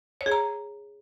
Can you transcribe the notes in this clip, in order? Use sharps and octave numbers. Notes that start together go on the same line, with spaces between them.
C#5
G#4
A#5